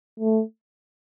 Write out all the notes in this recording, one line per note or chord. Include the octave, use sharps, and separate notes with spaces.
A3